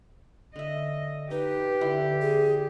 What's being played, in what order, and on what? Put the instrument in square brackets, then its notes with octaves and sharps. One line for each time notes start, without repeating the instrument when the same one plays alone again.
[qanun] D3 E5 [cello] D#5
[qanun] D#4 [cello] G4 [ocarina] B4
[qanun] D3 E4 C6
[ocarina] G#4